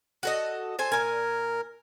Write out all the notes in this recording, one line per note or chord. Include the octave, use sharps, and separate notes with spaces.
F#4 A4 D#5
A4 C5 G#5
A#2 A#4 G#5